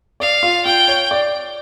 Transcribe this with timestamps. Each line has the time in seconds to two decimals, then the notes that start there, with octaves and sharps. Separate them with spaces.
0.20 D5 F5
0.43 F4
0.65 F4 G5
0.88 C#5
1.11 D5